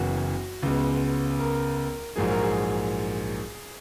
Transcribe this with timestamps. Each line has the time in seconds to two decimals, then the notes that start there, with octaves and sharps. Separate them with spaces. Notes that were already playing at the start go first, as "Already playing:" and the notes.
Already playing: F#1 F#2 E3 B3 F#4
0.63 C#2 C#3 G#3 B3
1.39 A#4
2.16 A#1 G#2 F#3 A#3 G#4
2.29 A#4
2.42 G#4